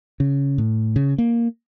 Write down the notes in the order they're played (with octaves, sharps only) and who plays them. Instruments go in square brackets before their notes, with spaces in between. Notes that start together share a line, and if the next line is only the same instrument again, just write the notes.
[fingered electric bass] C#3
A2
C#3
A#3